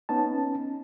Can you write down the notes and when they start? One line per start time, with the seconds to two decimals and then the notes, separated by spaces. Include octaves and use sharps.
0.09 B3 C#4 D#4 A5